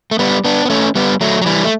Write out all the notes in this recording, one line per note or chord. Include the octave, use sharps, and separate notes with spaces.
A3
G3 B3
B3 D4
B3
A3 C#4
G3 B3
F#3 A3
F#3
E3 G3
A3